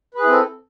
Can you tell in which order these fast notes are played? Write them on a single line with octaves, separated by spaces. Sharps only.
B4 G#4 E4 C4 A4